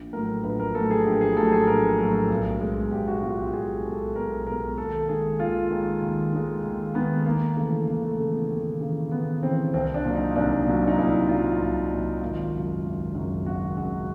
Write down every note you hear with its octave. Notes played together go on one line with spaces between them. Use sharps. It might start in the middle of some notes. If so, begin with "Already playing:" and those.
Already playing: A#1
A2 F#3 A#4
A#1 B4
A#4
A2 F#3 A4
G#4
A#1 G4
G#4
A2 F#3 A4
G#4
A#1 A#4
A2 F#3 A#4
B1
B2 G#3
B1 G4
F#4
B2 G#3 F4
G4
B1 G#4
B2 G#3 A4
B1 A#4
B2 G#3 A#4
D#2 A4
D#3 G#3 G#4
D#2 F4
D#3 G#3
D#2
D#3 G#3
D#2
D#3 G#3 B3
D#2 A#3
C#3 E3 A3
D#2 A#3
A3
C#3 E3 A3
B3
D#2
C#3 E3
D#2 B3
C#3 E3 C4
C2 C4
D4
A#2 F#3
D#4
C2 D4
A#2 F#3
D#4
C2 E4
A#2 F#3 F4
C2
A#2 F#3
G#1 F4
F#2 C#3 F#3
G#1
F#2 C#3 F#3
G#1 F#4
F#2 C#3 F#3 F#4